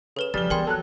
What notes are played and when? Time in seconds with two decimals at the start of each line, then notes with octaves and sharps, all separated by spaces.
0.17 C#3 A4 B4 E7
0.34 C#3 F3 G3 A6 G7
0.50 E3 B3 G#4 A#4 G5 C6
0.67 F#3 A4 F#6